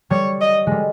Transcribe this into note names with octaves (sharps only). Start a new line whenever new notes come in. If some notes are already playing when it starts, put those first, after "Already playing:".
G3 C#5
D#5
G3 G#3